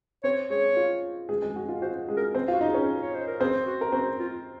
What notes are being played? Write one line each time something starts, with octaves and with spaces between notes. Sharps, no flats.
C4 C5 C#5
G#3 G#4 C#5
F4
G#3 G#4
G#3 G#4
F#4
F4
F#4 C5
G#3 G#4
A#4
C4 C5
F4 F5
F#4
D#4 D#5
C#4 G#4 C#5
C#5
C5
A#4
C4 G#4 C5
F#4
A#4
C4 F#4 C5
F4